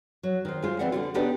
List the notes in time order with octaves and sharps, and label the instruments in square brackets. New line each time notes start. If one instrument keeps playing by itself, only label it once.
[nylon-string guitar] F#3
D#3 C5
G#3 F4 C5
E3 F#3 C4 D5 E5 F#5
D3 G3 F4
B3 D4 D#4 G4 B4 D5